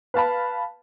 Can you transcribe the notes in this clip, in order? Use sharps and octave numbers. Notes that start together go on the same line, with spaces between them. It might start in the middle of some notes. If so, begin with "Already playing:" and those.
B4 F5 A5 B5